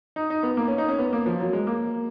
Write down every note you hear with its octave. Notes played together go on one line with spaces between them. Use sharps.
D#4
D#4
B3
A#3
C#4
D#4
C#4
B3
A#3
F3
F#3
G#3
A#3